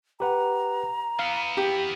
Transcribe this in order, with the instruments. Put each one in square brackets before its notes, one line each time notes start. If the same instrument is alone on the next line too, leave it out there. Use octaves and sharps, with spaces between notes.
[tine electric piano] G4 B4 F#5 [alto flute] A#5
[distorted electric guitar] E3 B3 [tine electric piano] F5
[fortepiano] G4